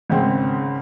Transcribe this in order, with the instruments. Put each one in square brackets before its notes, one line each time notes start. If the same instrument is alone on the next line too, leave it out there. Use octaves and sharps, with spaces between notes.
[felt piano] G#1 C#3 C4